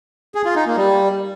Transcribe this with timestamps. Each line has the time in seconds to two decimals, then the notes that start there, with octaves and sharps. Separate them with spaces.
0.35 G#4
0.45 F4
0.56 D#4
0.66 A#3
0.77 G3